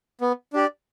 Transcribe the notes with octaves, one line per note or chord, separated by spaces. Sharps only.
B3
D4 G4 D5